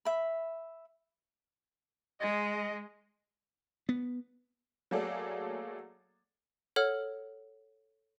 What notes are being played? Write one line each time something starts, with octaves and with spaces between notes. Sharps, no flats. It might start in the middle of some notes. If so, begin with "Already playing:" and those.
E5 B5
G#3 D#5
B3
F#3 A3 A#3 G#4 A4 D5
A4 C#5 F#5 F6